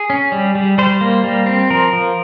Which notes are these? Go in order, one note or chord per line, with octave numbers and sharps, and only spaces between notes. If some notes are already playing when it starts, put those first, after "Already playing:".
Already playing: G#4
C#4
G3
G3
G3 C5
A#3
G3
C4
F3 A#4
F3